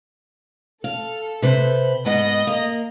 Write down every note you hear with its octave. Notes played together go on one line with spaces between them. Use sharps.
A4 F5
C3 B4 C5
G#2 B3 B4 D#5
A#3